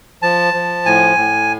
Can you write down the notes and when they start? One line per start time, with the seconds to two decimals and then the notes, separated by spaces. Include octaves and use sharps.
0.22 F3 A5
0.54 F3
0.86 A2 G#5
1.17 A2